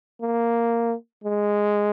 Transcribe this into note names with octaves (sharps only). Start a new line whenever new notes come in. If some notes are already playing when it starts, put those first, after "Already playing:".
A#3
G#3